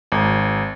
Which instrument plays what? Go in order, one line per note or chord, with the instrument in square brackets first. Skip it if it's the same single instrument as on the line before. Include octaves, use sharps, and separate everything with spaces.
[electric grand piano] G#1